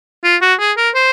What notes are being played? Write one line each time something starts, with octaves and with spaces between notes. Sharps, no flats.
F4
F#4
G#4
A#4
C5